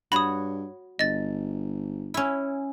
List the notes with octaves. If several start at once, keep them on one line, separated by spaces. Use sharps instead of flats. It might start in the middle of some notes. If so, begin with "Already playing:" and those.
G2 F#4 C#5 B5 D#6
G1 D#5 A6
C#4 E4